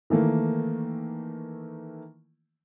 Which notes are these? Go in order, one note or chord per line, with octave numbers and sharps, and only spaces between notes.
D#3 E3 A3 A#3